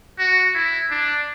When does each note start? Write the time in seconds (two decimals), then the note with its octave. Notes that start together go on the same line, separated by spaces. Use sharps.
0.19 F#4
0.55 E4
0.91 D4